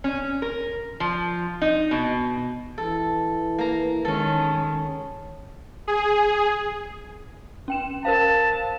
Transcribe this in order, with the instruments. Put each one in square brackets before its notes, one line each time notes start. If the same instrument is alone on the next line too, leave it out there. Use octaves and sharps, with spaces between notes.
[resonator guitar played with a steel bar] C#4
A#4
F3
D#4
B2
[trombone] E3 [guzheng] A4
[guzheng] A#3 A#5
[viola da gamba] D#3 G#3 [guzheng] C#4 A4
[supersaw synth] G#4
[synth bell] C#4 G5 E7
[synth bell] A#4 C5 F5 [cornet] A5